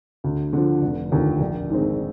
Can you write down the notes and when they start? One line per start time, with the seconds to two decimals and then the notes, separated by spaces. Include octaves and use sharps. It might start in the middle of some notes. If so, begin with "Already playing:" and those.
0.24 D2
0.53 D3 F3
0.82 F1
1.12 D#2 D3 F3
1.40 A#1
1.70 G#2 D#3 G#3 C4